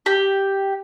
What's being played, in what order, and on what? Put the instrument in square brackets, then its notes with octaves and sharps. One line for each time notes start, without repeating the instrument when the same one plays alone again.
[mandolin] G4